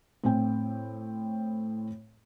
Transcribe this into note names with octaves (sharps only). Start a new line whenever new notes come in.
A2 C4 G5